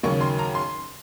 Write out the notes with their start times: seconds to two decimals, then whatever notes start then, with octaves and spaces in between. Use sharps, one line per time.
0.03 D#2 C#3 F#3 A#3 C#6
0.21 C6
0.39 A#5
0.55 C6